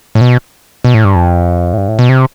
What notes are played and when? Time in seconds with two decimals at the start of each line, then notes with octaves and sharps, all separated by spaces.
0.15 A2
0.21 B2
0.85 B2
0.94 A2
1.05 G2
1.15 F2
1.73 A2
1.78 G2
1.88 A2
1.99 B2
2.09 C3